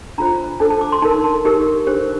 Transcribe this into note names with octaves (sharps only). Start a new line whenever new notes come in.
D4 F4 C5 A#5
D4 A4 C5 A5
A5
D6
C6
D#4 A#4 A5
A5
D#4 G4 A#4
D4 G4 C5